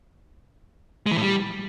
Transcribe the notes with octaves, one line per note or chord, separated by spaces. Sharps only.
G#3
E3
A2
G3